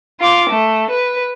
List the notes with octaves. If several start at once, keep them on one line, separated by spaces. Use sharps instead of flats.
F4 D6
A3
B4